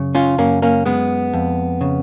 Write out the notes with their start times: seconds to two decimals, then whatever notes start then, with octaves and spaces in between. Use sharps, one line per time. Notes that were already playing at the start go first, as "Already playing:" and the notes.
Already playing: F#2 C#3
0.15 C#4 F4
0.38 F#2 A#3 C#4
0.62 A#3 C#4
0.86 G#3 B3
1.33 F2
1.81 C#3